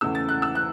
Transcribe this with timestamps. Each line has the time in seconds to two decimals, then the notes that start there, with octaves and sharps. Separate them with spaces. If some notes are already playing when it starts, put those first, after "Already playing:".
0.01 E2 C#3 E3 A3 C#4 E6
0.15 A6
0.29 F#6
0.42 E6
0.55 F#6